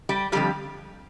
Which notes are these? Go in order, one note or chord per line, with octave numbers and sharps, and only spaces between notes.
G3 G4
F2 D3 F3 G3 G4